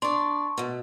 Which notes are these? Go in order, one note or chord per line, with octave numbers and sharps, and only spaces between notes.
D4 D5 C6 C#6
B2 A3